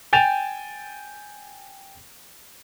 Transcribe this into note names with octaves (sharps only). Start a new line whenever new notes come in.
G5 G#5 A6 E7 F7